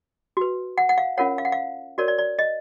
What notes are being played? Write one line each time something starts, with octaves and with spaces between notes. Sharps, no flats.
F#4 B4
F#5
F#5
F5
C#4 F4 A#4 C#5 F#5
F5
F#5
F5
F#4 A#4 C#5 D5
D5
D5
D#5